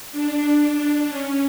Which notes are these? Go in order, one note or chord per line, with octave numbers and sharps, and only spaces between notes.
D4
C#4